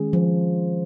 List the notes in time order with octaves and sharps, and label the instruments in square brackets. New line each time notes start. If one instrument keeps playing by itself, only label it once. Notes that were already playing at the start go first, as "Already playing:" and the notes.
Already playing: [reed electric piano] D#3 G#3 C#4 G#4
[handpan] F3